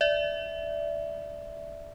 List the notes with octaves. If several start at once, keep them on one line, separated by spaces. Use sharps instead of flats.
D5 E5